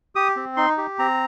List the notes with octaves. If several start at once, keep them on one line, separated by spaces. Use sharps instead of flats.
G4 D#6
C4
D#4 C6
G4
C4 A#5